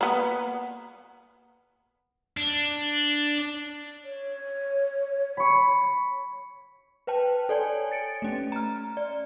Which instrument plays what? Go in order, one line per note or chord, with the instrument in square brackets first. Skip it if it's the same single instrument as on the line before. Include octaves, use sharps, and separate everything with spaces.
[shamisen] A#3 B3
[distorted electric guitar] D4
[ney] C#5
[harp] B5 C#6
[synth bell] B4 C5 G5 A5
A4 C#5 D5 G#5
A6 C#7 D7
A3 C#4
A#5 F6
D5